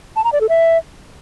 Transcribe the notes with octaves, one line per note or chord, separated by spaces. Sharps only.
A5
A#5
D5
A4
E5